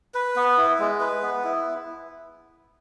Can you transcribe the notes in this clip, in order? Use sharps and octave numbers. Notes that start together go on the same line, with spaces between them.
B4
B3
E4
G#3
B4
B3
E4